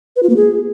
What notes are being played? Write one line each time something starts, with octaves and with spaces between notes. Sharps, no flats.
B4
F4
A#3
G#4